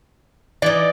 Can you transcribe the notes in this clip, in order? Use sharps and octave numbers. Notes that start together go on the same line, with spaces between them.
E3 D#4 D5